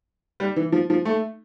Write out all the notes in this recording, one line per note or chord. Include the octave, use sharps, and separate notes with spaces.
G3
E3
F3
F3
A3